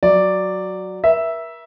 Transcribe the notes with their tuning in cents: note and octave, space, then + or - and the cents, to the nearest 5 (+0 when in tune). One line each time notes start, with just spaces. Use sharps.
F#3 +0 D5 +0
A#4 +40 E5 +0